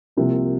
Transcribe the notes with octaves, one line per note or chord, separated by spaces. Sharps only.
C2 C3 F3 A#3